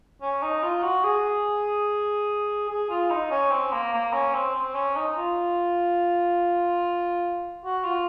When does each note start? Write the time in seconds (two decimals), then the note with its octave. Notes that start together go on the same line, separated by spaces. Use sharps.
0.22 C#4
0.42 D#4
0.63 F4
0.83 F#4
1.04 G#4
2.69 G#4
2.90 F4
3.10 D#4
3.31 C#4
3.52 C4
3.73 A#3
3.93 A#3
4.13 C#4
4.34 C4
4.55 C4
4.75 C#4
4.96 D#4
5.17 F4
7.65 F#4
7.84 F4